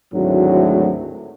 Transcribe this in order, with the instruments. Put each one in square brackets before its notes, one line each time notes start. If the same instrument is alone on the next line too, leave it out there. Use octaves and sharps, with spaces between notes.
[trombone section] G#1 D2 A2 F#3